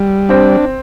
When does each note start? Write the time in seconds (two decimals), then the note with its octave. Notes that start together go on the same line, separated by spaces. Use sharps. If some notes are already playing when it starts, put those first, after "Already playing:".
Already playing: G3
0.29 C4 D4